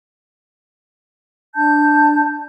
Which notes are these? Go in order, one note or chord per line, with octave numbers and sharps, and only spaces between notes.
D4 A5 G6